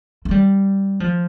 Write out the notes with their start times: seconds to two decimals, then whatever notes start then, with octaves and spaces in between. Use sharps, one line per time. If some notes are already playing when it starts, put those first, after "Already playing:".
0.25 A3
0.31 G3
1.00 F3